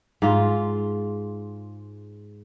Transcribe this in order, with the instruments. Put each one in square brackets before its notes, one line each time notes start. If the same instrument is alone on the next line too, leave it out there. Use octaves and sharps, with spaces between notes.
[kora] G#2 F4